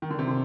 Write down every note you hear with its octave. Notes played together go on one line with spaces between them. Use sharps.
D#3
D3
C3
D3